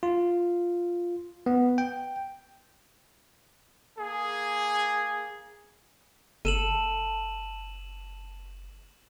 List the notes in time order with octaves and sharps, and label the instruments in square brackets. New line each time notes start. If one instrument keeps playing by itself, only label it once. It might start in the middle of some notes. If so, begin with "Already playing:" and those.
[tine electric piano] F4
B3
G5
[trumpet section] A#3 G#4
[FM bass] F#1 [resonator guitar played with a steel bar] A4 [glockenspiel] D#7 E7 F#7